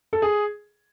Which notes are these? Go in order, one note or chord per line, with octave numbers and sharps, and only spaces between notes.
A4
G#4